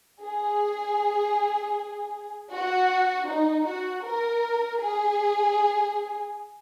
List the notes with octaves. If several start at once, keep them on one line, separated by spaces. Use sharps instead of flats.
G#4
F#4
D#4
F#4
A#4
G#4